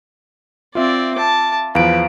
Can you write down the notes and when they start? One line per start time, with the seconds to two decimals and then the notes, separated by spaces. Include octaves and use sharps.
0.75 C4 F4 D5 E5
1.15 A5 D6
1.75 E2 F3 B4 F5 D7